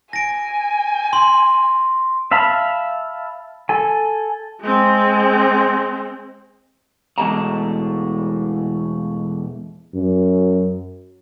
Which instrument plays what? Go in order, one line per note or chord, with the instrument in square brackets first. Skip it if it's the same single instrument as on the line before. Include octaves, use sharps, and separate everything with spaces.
[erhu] G#5 [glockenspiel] A#6 D7
[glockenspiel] C6
[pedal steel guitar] E5 F5 A5 B5
A4 G#5
[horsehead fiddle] G#3 C4
[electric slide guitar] E2 B2 G#3 A3 A5 A#5
[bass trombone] F#2